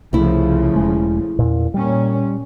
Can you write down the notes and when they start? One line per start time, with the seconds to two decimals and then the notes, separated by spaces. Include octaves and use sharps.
0.13 C2 C#3 F3 A3 E4
0.76 E1 G#3
1.39 E2 A#2
1.74 A#2 G3 C#4